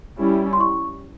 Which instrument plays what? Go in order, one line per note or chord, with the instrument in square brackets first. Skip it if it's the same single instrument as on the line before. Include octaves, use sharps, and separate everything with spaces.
[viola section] G3 C#4 E4
[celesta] C6
C#6